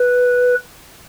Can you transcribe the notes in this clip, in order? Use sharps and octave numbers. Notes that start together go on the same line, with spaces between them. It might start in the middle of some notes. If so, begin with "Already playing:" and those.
Already playing: B4